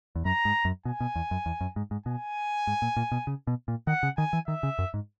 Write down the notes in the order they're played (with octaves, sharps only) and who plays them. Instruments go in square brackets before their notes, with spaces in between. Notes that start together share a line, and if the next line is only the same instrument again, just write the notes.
[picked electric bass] E2
[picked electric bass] F#2 [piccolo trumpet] A#5
[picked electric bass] G#2
F#2
[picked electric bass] B2 [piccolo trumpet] G#5
[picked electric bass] B2
E2
F#2
E2
F#2
G#2
G#2
[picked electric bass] B2 [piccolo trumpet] G#5
[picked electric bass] G#2
A#2
A#2
B2
C#3
B2
A#2
[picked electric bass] D#3 [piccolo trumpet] F#5
[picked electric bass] C#3
[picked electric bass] D#3 [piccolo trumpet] G#5
[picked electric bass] E3
[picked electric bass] D#3 [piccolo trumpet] E5
[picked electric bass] C#3
F#2
G#2